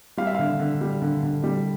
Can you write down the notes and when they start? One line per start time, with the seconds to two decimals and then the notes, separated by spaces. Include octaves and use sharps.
0.17 G3 F5
0.26 E5
0.35 D3 F5
0.59 D3
0.81 G3
1.02 D3
1.23 D3
1.44 G3